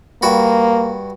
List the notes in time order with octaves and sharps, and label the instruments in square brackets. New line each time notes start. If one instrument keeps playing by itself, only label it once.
[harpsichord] G2 F#4 B5 [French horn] A#3